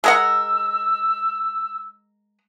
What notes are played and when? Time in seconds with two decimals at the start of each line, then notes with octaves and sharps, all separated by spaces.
0.04 G#3 A#4 F#5 E6